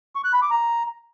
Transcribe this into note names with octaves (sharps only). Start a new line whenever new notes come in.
C#6
F#6
B5
D6
A#5